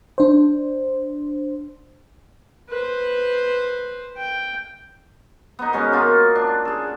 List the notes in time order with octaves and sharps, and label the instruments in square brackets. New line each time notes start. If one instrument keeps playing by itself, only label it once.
[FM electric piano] D4 C5
[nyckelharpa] B4 C5
G5
[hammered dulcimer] B3 D#4
B2 G#3 C#4
A#3 D#4 F4 F#4
D4
G#4 A4